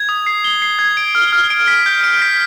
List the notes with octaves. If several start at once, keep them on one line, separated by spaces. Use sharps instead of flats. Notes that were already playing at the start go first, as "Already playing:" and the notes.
Already playing: G#6
D#6
C7
G7
C7
G#6
D7
F6
F6
D7
B6
G6
D7
B6